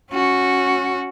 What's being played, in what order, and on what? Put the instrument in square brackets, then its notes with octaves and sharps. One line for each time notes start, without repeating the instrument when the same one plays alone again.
[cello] C#4 F#4